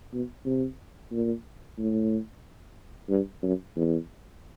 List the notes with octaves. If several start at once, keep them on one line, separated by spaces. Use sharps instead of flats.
B2
C3
A#2
A2
G2
F#2
E2